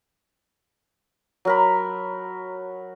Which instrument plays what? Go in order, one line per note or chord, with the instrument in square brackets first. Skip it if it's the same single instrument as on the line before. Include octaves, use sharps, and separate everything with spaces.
[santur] F#3 A#4 B5